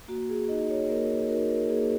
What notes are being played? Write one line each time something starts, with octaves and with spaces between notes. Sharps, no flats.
A#3 F#4
G#4
D#4 F#4 D#5
C#5
A#3 A#4
D#4 F#4 A#4
A#4
A#3 G#4